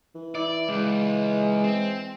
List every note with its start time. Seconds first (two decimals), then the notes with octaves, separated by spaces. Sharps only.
0.15 E3
0.35 E4 D5
0.69 C#2 G#3
1.64 C4